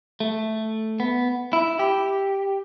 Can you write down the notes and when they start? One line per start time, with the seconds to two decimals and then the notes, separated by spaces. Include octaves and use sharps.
0.20 A3
1.00 B3
1.53 E4
1.79 G4